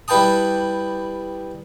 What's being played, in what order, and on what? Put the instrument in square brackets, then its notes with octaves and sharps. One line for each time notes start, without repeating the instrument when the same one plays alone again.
[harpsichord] G3 E4 B4 G5 A5 D#6